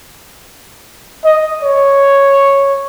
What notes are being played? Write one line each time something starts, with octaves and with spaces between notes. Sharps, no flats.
D#5
C#5